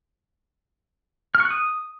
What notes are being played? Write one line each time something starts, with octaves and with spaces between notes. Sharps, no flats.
F6
C#6
F#6
D#6